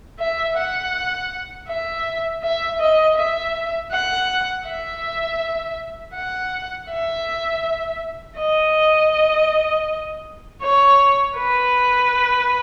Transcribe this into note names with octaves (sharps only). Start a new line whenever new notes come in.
E5
F#5
E5
E5
D#5
E5
F#5
E5
F#5
E5
D#5
C#5
B4